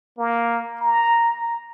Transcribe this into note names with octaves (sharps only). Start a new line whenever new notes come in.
A#3
A#5